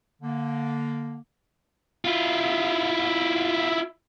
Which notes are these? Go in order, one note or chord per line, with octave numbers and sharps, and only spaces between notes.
D3 A#3
E4 F4